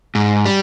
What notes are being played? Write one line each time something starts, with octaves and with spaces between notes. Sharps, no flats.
G#2
G3